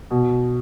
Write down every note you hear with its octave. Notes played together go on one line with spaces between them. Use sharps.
B2